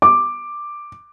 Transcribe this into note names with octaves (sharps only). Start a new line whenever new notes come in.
D6